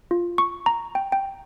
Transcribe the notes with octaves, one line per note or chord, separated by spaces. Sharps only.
F4
C#6
A#5
G5
G5